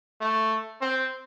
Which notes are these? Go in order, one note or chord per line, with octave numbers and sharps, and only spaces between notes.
A3
C4